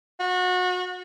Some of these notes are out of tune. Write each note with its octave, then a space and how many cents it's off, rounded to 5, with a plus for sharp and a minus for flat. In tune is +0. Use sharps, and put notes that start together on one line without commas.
F#4 -30